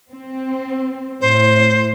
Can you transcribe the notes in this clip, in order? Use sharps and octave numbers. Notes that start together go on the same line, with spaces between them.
C4
A2 C5